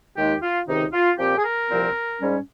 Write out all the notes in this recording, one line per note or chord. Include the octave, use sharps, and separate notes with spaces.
D#2 D#3 G#3 D#4 G4
F4
C#2 C3 D#3 D#4
F4
A#2 F3 C4 G4
G#4
A#4
C2 A#2 F3 C4
G#2 G3 C#4